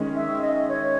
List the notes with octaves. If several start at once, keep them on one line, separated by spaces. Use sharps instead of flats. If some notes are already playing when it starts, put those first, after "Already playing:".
Already playing: D#3 G#3 C#4
E5
D#5
C#5